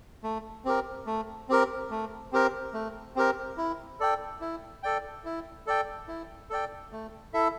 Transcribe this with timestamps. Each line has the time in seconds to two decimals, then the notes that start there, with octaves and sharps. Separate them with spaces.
0.23 A3
0.65 C4 G4 A#4
1.07 A3
1.49 C4 G4 A#4
1.91 A3
2.32 C4 G4 A#4
2.74 A3
3.16 C4 G4 A#4
3.58 E4
4.00 A4 D5 G5
4.41 E4
4.83 A4 D5 G5
5.25 E4
5.67 A4 D5 G5
6.08 E4
6.50 A4 D5 G5
6.92 A3
7.33 E4 A4 E5